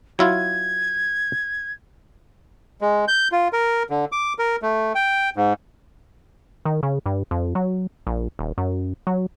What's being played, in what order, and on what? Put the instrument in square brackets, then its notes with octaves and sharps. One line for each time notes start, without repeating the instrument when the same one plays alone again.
[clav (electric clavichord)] F#3 E4 F4 [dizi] G#6
[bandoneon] G#3
G6
F4
A#4
D3
D6
A#4
A3
G5
G#2
[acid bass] D#3
C#3
G2
F2
F#3
A#1
D#1
F#2
F#3